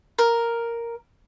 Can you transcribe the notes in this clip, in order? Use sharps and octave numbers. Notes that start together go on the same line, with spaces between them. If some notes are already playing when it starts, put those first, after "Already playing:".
A#4